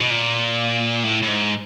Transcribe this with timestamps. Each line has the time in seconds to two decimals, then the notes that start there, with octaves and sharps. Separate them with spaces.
0.01 B2
0.10 A#2
1.04 A2
1.22 A2
1.27 G#2